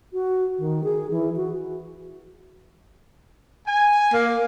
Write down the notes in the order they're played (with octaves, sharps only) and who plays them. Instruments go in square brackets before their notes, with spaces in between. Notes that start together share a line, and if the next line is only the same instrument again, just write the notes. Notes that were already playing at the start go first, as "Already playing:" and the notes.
[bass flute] F#4
D#3
G#4
E3
F#4
[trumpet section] G#5
[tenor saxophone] A#3